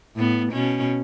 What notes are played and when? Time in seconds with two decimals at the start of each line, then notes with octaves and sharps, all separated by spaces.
0.15 A2 B3
0.52 B2 C#4